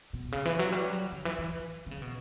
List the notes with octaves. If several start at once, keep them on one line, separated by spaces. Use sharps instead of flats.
B2
C#3
E3
F#3
G3
F#3
D3
E3
E3
D3
C#3
B2